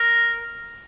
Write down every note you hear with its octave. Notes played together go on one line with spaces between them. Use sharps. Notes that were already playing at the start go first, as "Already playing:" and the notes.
Already playing: A#4